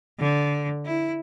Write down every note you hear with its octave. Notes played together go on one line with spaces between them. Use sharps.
D3
E4